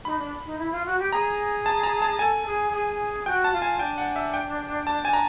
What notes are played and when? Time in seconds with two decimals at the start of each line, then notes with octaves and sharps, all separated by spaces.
0.05 D#4 B5
0.19 D4
0.46 D#4
0.59 E4
0.72 F4
0.86 F#4
0.99 G4
1.12 G#4 A#5
1.66 A5
1.83 A#5
2.02 A5
2.19 A4 G#5
2.46 G#4
2.73 G#4
3.26 F#4 G5
3.44 A5
3.53 F4
3.62 G#5
3.79 D4 G5
3.98 F#5
4.16 E5
4.34 G5
4.87 A5
5.05 G#5
5.13 A#5